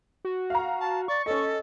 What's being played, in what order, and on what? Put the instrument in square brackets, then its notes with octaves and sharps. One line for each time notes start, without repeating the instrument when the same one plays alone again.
[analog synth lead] F#4
[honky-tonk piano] F5 A#5
[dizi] A5
[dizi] D5 [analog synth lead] C#6
[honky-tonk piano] C#4 D#5 [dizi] A4